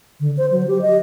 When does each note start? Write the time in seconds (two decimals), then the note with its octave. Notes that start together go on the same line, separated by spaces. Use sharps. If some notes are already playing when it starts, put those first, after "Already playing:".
0.20 D3
0.37 C5
0.51 F#3
0.68 G4
0.82 D#5